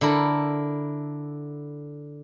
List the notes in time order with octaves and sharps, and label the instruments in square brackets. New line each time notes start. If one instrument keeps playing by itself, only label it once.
[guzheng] D3 E4 A4 A#4